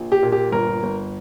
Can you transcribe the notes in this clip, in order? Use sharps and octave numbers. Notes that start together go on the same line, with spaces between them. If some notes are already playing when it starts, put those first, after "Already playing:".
Already playing: A#1
G4
A#2
G4
G1 A#4
G1